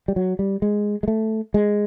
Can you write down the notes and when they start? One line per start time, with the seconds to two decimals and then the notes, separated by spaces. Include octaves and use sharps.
0.08 G3
0.16 F#3
0.39 G3
0.62 G#3
1.03 G#3
1.08 A3
1.54 G#3